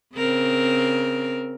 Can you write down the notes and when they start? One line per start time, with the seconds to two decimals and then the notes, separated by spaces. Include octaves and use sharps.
0.15 C#3 C4 A#4